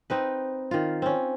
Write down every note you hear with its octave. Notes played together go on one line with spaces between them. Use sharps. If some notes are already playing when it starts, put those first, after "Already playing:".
C4 D#4 B4
D#3 F4
C4 C#4